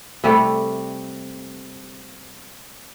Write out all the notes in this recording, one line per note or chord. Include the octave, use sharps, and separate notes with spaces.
C3 G3 A3